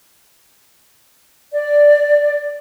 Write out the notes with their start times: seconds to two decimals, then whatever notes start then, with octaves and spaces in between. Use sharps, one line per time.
1.52 D5